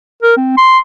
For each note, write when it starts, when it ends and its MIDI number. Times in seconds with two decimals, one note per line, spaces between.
0.22 0.35 70
0.37 0.54 60
0.57 0.78 84